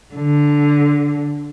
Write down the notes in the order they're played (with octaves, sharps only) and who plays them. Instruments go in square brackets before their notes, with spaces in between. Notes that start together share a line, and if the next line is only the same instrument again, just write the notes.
[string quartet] D3